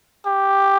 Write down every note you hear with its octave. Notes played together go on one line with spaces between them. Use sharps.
G4